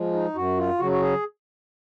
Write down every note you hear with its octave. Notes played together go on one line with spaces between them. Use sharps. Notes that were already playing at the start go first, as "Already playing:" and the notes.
Already playing: F3 G#3
D#4
F#2 F#4
F4
C#3 F#3 F#4
F#4
G#4